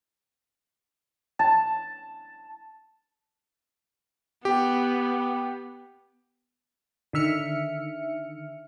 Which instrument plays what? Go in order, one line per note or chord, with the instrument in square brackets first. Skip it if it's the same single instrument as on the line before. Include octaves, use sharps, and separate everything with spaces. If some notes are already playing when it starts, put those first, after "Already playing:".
[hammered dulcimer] A5
[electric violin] B3 [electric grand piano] G4
[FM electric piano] D3 D#3 E5 F6 C#7